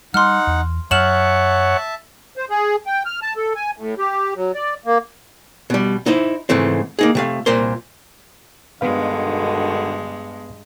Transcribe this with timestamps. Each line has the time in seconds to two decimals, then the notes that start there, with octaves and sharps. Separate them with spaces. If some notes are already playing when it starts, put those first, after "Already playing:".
0.14 G3 D#4 F#5 C6 F6
0.47 E2
0.91 F#2 C#5 E5 F#5 A5 F6 E7 F#7
2.37 C5
2.50 G#4
2.86 G5
3.06 F6
3.22 A5
3.36 A4
3.56 G#5
3.77 A2
3.98 G4
4.36 F#3
4.55 D5
4.85 A#3
5.70 B2 G3
6.06 D#4 E4 C5
6.49 G#2 C#3 E3 A3 C4
6.99 A#3 D#4 G#4
7.15 C3 A3 F5
7.46 C2 A#2 A#4 C5 C6
8.81 G2 B2 D3 D#3 G#3 B3 B4 F5